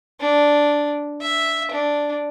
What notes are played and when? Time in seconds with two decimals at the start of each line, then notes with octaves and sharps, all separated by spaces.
0.20 D4
1.21 E5
1.71 D4